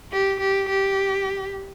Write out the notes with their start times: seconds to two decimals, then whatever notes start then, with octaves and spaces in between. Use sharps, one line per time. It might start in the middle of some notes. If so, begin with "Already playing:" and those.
0.12 G4
0.40 G4
0.69 G4